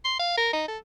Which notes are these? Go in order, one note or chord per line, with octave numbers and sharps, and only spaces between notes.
C6
F5
A#4
D#4
A4